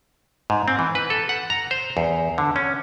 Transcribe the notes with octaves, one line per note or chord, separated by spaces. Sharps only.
G#2
C4
E3
B4
A4
F#5
A#5
C5
E2
D3
C#4